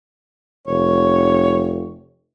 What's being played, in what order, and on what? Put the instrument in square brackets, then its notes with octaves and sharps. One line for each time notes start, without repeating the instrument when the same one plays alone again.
[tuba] F1 [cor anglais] C#5